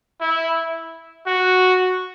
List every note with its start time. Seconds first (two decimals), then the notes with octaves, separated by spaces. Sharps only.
0.21 E4
1.27 F#4